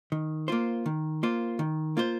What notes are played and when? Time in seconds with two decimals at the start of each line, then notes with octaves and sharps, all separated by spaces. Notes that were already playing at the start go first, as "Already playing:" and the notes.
0.12 D#3
0.48 A#3 F4 C5
0.86 D#3
1.23 A#3 F4 C5
1.59 D#3
1.97 A#3 F4 C5